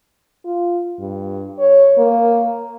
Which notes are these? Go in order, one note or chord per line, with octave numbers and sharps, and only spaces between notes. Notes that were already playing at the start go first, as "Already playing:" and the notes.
F4
G2
C#5
A#3